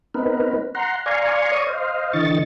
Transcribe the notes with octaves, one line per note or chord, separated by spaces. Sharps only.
B3 C4 D#4 A#4 B4
F#5 A#5 C6
D5 F5 G#5 A#5 C6 C#6
C#5 D5 C#6 D#6
C5 D#5 F5
D3 E3 D#5 C#6 A6